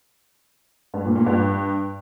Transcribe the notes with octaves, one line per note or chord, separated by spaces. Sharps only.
G2
A#2
A#2
G2